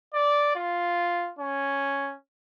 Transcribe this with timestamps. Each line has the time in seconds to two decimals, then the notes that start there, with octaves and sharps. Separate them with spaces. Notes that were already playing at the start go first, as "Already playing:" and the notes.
0.14 D5
0.56 F4
1.39 C#4